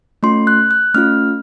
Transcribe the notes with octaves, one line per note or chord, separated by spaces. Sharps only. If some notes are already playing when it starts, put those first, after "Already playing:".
A3 C#4 F4 C6
F#6
F#6
A3 C#4 F4 F6